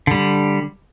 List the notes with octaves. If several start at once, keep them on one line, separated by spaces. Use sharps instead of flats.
D3 G3